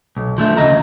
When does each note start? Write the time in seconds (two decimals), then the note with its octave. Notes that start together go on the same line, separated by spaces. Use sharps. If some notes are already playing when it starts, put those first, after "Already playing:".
0.17 B1
0.38 F3 A3 D4
0.57 D2 C#3 D#5 A#5